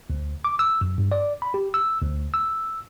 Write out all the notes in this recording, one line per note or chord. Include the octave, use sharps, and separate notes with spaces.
D2
D6
E6
F#2
G2
D5
B5
G4
E6
D2
E6